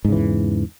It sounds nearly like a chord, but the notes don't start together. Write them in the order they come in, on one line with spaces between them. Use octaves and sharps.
G#2 C#3 E3 E2